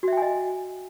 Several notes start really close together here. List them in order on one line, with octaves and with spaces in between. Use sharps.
F#4 E5 G5 G#5 D#5